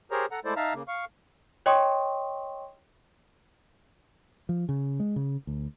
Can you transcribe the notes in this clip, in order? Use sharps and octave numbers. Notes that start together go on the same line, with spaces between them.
G4 G#4 A#4 C5 C#5 A#5
A4 F#5 A#5
G#3 A3 E4 A4 C5 D5
D#4 E5 F5 A5 A#5
C#3 A#3
F5 C#6
C#5 D#5 G5 C6 C#6 D#6
F3
C#3
G#3
C#3
D2